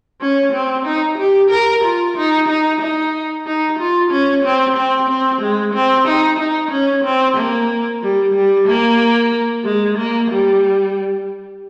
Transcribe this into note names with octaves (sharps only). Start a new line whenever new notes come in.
C#4
C4
D#4
G4
A#4
F4
D#4
D#4
D#4
D#4
F4
C#4
C4
C4
C4
G#3
C4
D#4
D#4
C#4
C4
A#3
G3
G3
A#3
G#3
A#3
G3